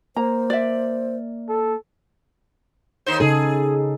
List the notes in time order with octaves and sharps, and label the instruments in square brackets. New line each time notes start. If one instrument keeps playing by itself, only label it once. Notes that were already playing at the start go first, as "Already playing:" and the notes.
[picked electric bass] A#3 [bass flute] C5 [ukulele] A#5
[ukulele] D5 E5
[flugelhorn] A4
[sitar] D#2 D#4 C5
[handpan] C#3 D#4 A4 [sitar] G#4